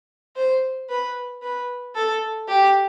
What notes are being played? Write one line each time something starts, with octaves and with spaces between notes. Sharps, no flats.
C5
B4
B4
A4
G4